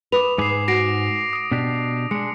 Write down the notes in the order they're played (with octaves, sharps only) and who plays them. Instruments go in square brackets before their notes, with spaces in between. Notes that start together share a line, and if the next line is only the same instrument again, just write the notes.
[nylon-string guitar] B4 [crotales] D6 D#6 F7
[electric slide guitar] G#2 G#4 [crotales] D6 C7
[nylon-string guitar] F#4 [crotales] A#6 C7 D7
[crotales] D#6 D7
[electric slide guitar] B2 D4 G4
[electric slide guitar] G#3 D4 [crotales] C#7